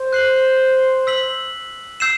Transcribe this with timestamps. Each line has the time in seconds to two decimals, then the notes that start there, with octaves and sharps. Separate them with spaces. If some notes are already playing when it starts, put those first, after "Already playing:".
Already playing: C5
0.13 F#6 C7 F#7
1.07 E6 B6 F#7
2.00 E6 G6 C7 E7